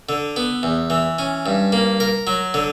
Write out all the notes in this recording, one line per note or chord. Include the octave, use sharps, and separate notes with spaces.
D3
B3
E2
E3
C#4
G2
A#3
A#4
F#3
D3